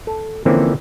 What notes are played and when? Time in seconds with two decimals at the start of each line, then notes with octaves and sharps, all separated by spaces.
0.07 A4
0.45 D3 E3 F3 A#3 C4 C#4